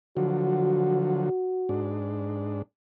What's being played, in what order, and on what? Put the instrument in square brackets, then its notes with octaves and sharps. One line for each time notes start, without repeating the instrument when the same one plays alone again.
[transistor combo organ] D3 F3 F#3 [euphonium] F#4
[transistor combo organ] G#2 D4